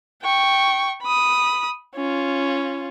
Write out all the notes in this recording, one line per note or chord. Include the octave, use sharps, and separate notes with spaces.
G5 C#6
B5 D#6
C#4 F4